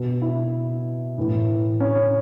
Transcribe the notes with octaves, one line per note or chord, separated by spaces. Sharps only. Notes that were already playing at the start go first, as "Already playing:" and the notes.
Already playing: B2
E4
A2 E3
C#4